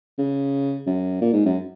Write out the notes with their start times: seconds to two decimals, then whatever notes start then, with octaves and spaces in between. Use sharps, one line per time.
0.18 C#3
0.87 F#2
1.21 A#2
1.33 G#2
1.45 F#2